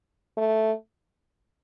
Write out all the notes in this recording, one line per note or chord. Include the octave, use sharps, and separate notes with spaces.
A3